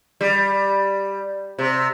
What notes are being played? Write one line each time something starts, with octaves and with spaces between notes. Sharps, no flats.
G3
C3